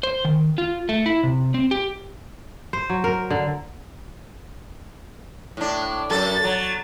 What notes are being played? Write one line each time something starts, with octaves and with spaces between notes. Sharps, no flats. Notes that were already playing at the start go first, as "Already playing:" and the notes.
C5
D#3
F4
A3
E4
C3
C4
G4
C5
F#3
A#4
D3
A2 D4
F#2 A4 A6
F#3